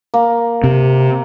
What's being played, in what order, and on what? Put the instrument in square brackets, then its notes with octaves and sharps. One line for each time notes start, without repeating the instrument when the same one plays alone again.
[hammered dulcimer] A#3
[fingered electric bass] C3